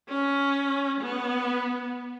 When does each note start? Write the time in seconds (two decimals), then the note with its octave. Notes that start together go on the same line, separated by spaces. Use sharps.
0.09 C#4
1.01 B3